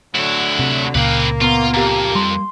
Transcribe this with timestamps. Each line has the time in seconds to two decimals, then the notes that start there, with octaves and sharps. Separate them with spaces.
0.15 D2 D3 F#3 E4
0.59 C3
0.95 C#2 A#2 C#3 A#3 C4 B4
1.42 B3 F4 A#5
1.74 F2 G4 A#5
2.15 G3 C6